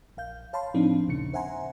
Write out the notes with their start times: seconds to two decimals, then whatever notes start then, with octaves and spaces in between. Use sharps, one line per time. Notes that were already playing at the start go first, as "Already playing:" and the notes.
0.17 A#1 F5 G6
0.53 C#5 F5 A5 B5 C6
0.74 A2 F3 C4 D4 D#4
1.07 A#1 D#2 A#2 C#3 C#7
1.33 C5 E5 F#5 G#5 A#5 C6